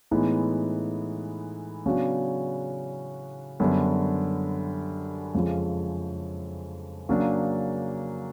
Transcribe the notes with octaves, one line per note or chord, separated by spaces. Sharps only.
A2 E3 G#3 B3 D#4
C#3 F#3 B3 D4 F#4
F#2 D3 G3 B3
F2 C#3 F3 G#3
C#3 F#3 A#3 D4